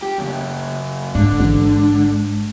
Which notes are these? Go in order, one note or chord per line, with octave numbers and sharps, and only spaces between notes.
G4
F#2 C#3
G#2 D3 D4
A1